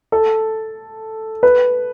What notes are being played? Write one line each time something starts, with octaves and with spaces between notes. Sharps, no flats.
A4
B4